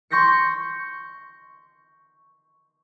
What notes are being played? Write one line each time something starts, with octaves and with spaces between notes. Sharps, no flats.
C6 C#6 G6 A#6 B6 C#7